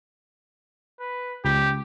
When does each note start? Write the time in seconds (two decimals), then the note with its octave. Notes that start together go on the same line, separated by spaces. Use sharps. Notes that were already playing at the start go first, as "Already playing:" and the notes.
1.00 B4
1.45 C#2 G4